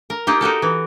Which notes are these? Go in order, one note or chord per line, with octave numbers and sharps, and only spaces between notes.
A#4
A#3 D#4 F4 G4
D#4 F#4 G4 A4
E3